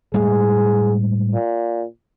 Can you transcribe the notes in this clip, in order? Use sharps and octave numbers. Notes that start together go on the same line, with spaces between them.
A2 G3 G#3 G#4
A#2